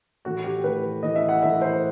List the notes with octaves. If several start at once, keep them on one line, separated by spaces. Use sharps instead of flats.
A2 E3 A3 F#4
G4
A2 E3 A3 B4
A2 E3 A3 D#5
E5
F#5
A2 E3 A3 E5
C5